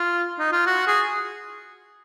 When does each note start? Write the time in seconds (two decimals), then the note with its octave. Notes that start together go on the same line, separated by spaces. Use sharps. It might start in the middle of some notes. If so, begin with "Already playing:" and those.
Already playing: F4
0.39 D#4
0.52 F4
0.66 F#4
0.87 G#4